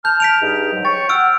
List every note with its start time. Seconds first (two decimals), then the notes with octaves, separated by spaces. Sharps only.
0.05 A5 F6 G6
0.20 B6 D7 F7
0.42 G2 D#4 G#4
0.73 G#2 F#3
0.85 C#5 G5 C#6 A6
1.09 F#5 E6 F6 D7